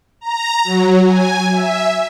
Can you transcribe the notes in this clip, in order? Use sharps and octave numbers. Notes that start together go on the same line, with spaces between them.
A#5
F#3
G#5
E5